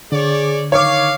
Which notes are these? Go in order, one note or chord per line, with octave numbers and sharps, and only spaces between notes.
D3 G#4 C#5 D5
D#3 C#5 F5 C#6 D6